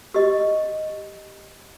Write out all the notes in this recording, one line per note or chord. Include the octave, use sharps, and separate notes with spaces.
G4 D#5